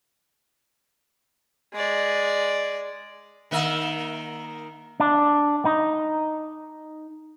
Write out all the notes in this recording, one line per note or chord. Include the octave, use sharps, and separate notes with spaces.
G#3 D5
D#3 A#3 E5
D4
D#4